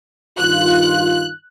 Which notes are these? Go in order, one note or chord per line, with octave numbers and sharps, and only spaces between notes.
G2 D#3 F4 F#6